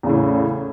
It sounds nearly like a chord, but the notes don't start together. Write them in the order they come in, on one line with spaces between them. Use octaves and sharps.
E2 C#3 A2